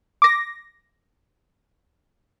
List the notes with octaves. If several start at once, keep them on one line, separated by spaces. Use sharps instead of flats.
D6 A#6